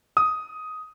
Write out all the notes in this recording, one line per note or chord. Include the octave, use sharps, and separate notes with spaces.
D#6